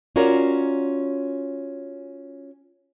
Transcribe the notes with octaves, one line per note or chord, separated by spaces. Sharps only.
C#4 F4 F#4 A#4 C#5 D5